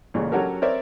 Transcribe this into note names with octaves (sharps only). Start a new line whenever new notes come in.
A1 A#2 C#3
F#3 C#4 F#4 G4 A4 A#4
C4 A#4 C#5 D5 E5